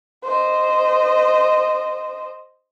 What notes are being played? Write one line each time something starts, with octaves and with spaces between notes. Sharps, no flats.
C5 D#5